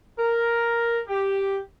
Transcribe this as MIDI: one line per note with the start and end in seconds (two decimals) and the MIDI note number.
0.18 1.00 70
1.08 1.57 67